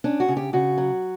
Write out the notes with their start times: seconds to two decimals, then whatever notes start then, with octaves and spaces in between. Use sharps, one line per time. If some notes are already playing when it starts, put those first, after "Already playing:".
0.04 C#4 D4
0.20 F#4
0.28 C#3
0.37 G4
0.53 C#3 F#4
0.78 F#3